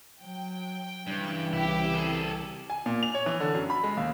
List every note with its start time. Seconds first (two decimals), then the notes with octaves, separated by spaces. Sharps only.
0.23 F#3 G5
1.07 G2 C#3 E3
1.53 C2 E4 G4
1.94 G#4 A4
2.70 G#5
2.86 A#2
3.03 F7
3.14 C#5
3.26 E3
3.40 D3
3.55 F#2
3.70 B5
3.84 G#3
3.97 D#2